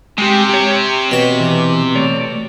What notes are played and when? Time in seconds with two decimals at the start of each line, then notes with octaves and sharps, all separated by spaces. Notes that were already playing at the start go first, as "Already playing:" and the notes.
0.18 C3 G#3 G4
0.49 G4 C#5
1.11 B2 C#6
1.40 E3
1.95 A3 C#5 D5